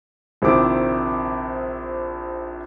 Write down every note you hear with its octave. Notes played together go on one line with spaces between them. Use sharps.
A#1 C3 D#3 E4 D6